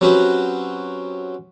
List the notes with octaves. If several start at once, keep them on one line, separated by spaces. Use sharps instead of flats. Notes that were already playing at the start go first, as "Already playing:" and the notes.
F#3 C4 C#4 F#4 G4 B4